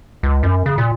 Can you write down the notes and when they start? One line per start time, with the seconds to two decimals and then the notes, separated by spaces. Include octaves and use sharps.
0.23 C#2
0.43 F#2
0.66 C#3
0.78 A#2